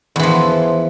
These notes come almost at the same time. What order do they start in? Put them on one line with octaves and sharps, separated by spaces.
E2 E3 F3